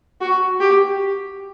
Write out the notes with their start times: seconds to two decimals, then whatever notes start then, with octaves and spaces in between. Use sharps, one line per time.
0.21 F#4
0.60 G4